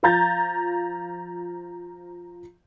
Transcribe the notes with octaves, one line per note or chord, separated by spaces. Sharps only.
F3 F5 A#5 G6 A6 A#6